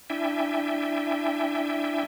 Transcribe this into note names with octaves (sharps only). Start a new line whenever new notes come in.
D4 E4 E5 G5 G#5